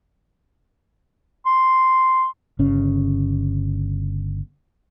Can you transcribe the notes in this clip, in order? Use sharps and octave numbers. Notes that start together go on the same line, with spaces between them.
C6
G1 C#3 C#4